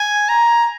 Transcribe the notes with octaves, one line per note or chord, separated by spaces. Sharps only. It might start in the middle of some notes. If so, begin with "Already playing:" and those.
Already playing: G#5
A#5